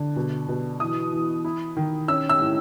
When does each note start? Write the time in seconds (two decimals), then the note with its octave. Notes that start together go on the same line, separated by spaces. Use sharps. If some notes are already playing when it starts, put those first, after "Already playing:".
Already playing: D3
0.16 B2
0.48 B2
0.80 E3 D#6
1.12 E3
1.44 E4
1.77 D#3
2.08 C#4 E6
2.29 E6
2.40 A2